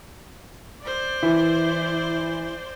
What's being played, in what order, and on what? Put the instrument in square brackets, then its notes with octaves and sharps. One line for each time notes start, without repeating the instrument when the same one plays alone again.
[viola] C5 D5
[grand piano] E3 [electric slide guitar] E4